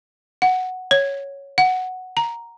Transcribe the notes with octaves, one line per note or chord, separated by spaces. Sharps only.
F#5
C#5
F#5
A#5